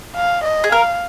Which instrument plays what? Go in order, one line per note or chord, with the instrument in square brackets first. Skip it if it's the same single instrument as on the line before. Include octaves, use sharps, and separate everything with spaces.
[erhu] F5
D#5
[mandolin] G#4
[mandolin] A#4 [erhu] F5